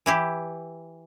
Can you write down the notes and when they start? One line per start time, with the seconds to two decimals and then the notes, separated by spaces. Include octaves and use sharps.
0.06 E3 E4 G4